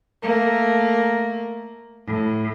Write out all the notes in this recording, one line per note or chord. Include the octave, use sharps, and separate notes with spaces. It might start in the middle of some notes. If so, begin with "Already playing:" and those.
A3 A#3
A2